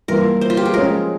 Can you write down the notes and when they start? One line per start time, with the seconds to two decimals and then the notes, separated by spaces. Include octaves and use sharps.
0.08 E3 G3 A#3 F4 A#4
0.41 C5
0.50 F4
0.57 G4
0.65 G#4
0.73 F3 G#3 C#4 A#4